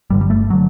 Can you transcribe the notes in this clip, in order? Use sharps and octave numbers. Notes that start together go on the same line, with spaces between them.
G1 G2 D3 G3
G3
A3
D3 F#3